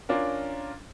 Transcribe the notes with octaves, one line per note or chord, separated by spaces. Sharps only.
C#4 D4 F4 A#4